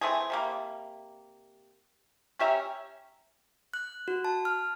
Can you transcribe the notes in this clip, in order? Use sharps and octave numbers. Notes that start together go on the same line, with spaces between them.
E3 A3 C4 G#4
C3 G3 A#3
C#4 G4 E5 A#5
F#6
F#4
A5
F6